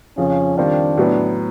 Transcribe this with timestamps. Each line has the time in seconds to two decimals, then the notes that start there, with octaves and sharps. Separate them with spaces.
0.18 F2 C#3 F3 C#4
0.57 D#3 G3 C4 D4 F4
0.97 A2 F#3 B3